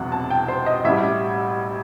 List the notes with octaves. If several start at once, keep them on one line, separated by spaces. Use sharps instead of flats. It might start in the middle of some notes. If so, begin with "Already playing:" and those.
Already playing: E1 E2 C3 F#3 B3 F#5
A5
G5
C5
D#5
A1 A2 G3 E5